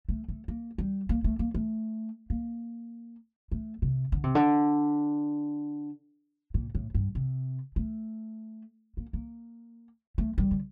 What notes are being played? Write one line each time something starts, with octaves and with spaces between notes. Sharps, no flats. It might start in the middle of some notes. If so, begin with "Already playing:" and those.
A3
A3
A#3
G3
A#3
A3
A#3
A3
A#3
A3
C3
D3
C3
D3
A#2
A2
G2
C3
A3
A#3
A#3
A3
G3
D3